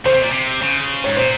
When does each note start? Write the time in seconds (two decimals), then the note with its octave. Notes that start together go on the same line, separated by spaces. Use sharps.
0.05 C#3 C5
0.14 C3
0.23 A#2
0.31 C3
0.62 C#3
1.04 G#2 C#5
1.17 A#2 C5